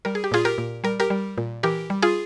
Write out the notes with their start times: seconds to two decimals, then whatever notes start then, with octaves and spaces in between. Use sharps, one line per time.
0.05 G3 A#4
0.15 G#4
0.24 G4
0.32 A#2 F4 G#4
0.45 G4 A#4
0.58 A#2
0.84 G3 A#4
1.00 G4 A#4
1.10 G3
1.38 A#2
1.63 E3 G4 A#4
1.90 G3
2.02 F4 G#4